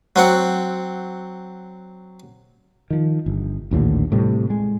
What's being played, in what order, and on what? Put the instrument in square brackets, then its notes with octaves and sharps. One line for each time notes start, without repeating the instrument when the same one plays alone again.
[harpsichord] F#3 C4 F#5
[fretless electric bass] D#3 F3
G1
A#1 D#2 A2 D3
A2 C3 G3
G#3